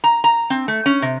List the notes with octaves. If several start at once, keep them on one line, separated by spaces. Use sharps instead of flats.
A#5
A#5
C4
A3
C#4
C3